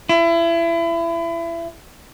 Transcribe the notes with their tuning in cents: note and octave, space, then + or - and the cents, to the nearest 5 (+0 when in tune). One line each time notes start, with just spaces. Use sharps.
E4 +30